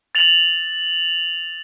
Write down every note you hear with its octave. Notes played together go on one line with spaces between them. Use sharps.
A6 F7 F#7